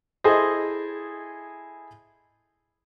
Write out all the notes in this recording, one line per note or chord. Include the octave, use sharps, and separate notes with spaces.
E4 G#4 A4 C5 D#5